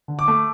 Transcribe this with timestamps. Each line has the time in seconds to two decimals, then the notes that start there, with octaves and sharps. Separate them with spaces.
0.08 D3
0.19 D6
0.28 A3